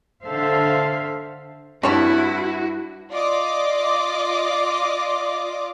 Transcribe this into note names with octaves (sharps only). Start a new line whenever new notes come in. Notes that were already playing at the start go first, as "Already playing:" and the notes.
D3 A4 C5 E5 F5
G2 C4 E4 F#4 C#5 A5
F4 D5 D#5 D6